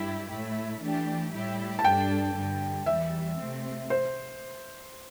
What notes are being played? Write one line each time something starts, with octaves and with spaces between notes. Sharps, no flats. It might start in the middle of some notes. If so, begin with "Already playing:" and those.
Already playing: G2 G3 E4 G4
A2 A3 E4
E3 A3 D4 G4
A2 G3 E4 G4
A5
G2 G3 D4 A4 G5
G2 D3 G3
E2 E3 G3 E5
C3 A3 C4
C5